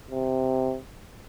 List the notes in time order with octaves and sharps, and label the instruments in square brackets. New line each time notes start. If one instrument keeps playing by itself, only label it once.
[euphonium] C3